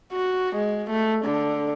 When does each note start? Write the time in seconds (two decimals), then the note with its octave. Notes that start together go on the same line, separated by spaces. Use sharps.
0.13 F#4
0.56 G#3
0.90 A3
1.25 D3